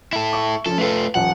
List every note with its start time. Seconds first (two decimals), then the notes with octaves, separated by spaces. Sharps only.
0.13 E4 A4
0.33 E5 C#6
0.66 F3 C#4 A4
0.78 A3 F4 A4 B4
1.15 D#1 F3 F#5